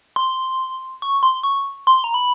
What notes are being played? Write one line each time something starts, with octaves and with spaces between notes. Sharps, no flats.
C6
C#6
C6
C#6
C6
A#5
B5